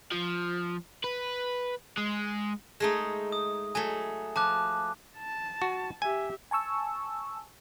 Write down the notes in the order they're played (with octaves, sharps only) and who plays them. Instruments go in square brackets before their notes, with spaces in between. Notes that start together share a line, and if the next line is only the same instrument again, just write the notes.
[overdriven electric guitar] F3
B4
G#3
[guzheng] G#3 A3 D#4
[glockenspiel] D#6
[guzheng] F#3 A3 [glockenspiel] G#5
[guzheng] F3 [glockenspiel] A5 D6 F#6
[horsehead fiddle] A5
[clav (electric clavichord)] F#4
[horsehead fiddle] G4 E5 [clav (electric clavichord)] G#5
[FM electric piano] G#5 A5 C#6 E6